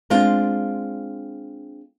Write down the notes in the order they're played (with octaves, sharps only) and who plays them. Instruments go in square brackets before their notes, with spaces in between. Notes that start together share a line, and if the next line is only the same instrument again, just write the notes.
[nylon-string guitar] G#3 C4 D4 F4